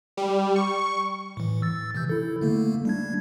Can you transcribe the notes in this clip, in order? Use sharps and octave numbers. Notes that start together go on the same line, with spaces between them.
G3
C#6
A2 E3
E6 A6
C3 E3 G6
E4 A4
D3 A3 A#3
G3 D4 G#6